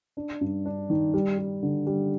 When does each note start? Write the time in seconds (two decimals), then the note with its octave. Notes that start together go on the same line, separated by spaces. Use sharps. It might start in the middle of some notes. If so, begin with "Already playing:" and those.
0.17 D4
0.41 G2
0.65 D4
0.90 D#3
1.14 G3
1.38 G3
1.63 D3
1.87 G3